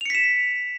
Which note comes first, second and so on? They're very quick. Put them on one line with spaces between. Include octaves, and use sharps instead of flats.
F7 C#7 B6 E7